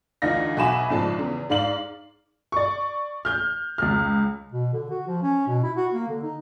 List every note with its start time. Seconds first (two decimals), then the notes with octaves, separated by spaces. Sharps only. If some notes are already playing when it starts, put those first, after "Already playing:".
0.22 D2 E3 D#4 F4 F5 A#6
0.57 B1 F#4 E5 G#5 B5 E7
0.90 A#1 G#2 C#3 F3 G#3 A5
1.18 E2 C#3
1.50 G#2 D5 F5 F#7
2.52 D5 C#6
3.25 F6 G6
3.78 C#2 F6
4.52 B2
4.73 D3
4.90 F#4
5.08 F3
5.22 C#4
5.48 B2
5.63 E4
5.76 F#4
5.94 A#3
6.09 D3
6.23 D#4